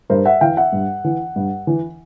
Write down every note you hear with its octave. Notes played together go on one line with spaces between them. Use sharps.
G2 A#4 C5
E5 F#5
E3 F5 G5
E5 F#5
G2
E3
G2
E3